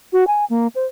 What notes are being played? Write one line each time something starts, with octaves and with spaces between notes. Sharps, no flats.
F#4
G#5
A#3
C5